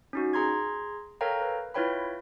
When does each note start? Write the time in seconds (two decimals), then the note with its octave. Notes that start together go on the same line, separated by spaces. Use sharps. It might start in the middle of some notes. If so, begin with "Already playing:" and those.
0.13 C#4 D#4 F#4
0.33 G#4 A#5 C6 G#6
1.21 A4 A#4 C#5 F5 G5 A#5
1.42 B4
1.74 E4 F4 B4 C#5 G5 B5